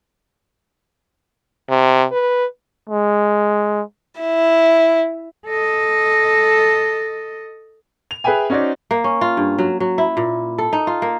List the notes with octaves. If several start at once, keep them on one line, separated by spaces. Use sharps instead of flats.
C3
B4
G#3
E4
A4 D#5
F7
G#4 B4 E5 G5 G#5
C#4 D#4 F#4 C5 D5
A#3
C#4
F4
G2
F#3
F#3
E4
A#2
A4
D#4
F4
A#3